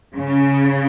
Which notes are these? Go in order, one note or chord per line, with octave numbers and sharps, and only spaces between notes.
C#3